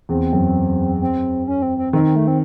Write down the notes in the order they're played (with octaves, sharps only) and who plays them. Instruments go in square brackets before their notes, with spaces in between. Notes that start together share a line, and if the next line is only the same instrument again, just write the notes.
[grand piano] E2 [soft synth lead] C4
[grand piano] F#2
[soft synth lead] C4
C#4
C4
C4
[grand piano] D#3 [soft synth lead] C4
[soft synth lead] C4
A3
C4